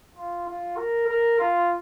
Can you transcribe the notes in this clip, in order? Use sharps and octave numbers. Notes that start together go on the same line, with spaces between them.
F4
F4
A#4
A#4
F4